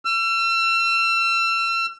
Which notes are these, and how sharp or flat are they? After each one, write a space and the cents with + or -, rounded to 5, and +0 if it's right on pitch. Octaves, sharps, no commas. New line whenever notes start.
E6 +40